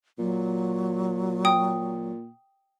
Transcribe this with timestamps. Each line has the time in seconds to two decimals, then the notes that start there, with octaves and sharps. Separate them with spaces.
0.19 A#2 F#3
1.45 G5 D#6